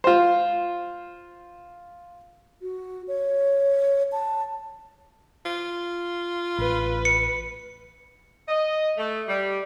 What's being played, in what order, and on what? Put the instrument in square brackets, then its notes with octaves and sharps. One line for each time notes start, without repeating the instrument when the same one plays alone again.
[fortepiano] F4 C5
[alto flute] F#4
C#5
A5
[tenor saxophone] F4
[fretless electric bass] A1 [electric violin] B4
[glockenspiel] C#7
[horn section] D#5
A3
G3